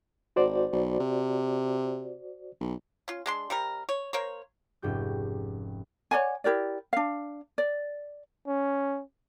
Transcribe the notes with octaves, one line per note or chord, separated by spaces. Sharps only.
G#1 F#4 C5 D5
B1
C3
B1
C#4 F4
G#3 D4 C6
C3 G3 A#4
C#5
A#3 A#4 C5 C#5
F1 G#2 C#4 G4 G6
C#5 D5 F#5 G#5
E4 G4 A#4 D5
D4 F5
D5
C#4